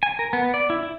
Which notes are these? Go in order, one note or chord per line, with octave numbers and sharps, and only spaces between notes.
G#5
A#4
B3
D5
E4
E4